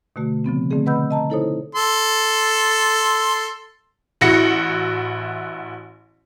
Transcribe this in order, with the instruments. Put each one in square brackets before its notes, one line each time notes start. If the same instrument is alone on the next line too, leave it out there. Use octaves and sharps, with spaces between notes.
[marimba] B2 D3 A3 F#4
C#3 F3 B3 C4
D3 A3 C4 G#4
B4 D#5 F#5 B5 E6 G6
D#5 A5 A#5
D#4 E4 A4 C5 C#5 D#6
[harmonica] A4 C6
[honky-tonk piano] A1 E4 F#4 A#6 C#7